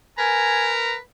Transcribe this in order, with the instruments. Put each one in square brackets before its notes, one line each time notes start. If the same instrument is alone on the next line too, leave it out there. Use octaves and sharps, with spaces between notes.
[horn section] A#4 B4 A#5 [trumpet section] G#5